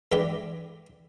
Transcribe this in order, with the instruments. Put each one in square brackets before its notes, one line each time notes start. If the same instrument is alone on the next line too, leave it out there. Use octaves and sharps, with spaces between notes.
[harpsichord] G2 E3 G#3 G4 D5 B5